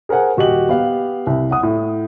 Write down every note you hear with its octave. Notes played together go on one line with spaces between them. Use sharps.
G#4 A#4 C5 F#5 G#5
D#1 F#4 G4 D#5 F#7
B3 G4 F5
C2
F#5 D#6
A2